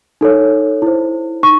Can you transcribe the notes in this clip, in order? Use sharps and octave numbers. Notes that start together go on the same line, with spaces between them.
D#4 A4 C#5
E4 C5
D#4 C#6